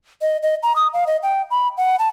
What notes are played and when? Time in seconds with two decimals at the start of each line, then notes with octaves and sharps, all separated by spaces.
0.22 D#5
0.43 D#5
0.63 A#5
0.76 D#6
0.94 F5
1.07 D#5
1.23 G5
1.51 B5
1.77 F#5
1.99 A5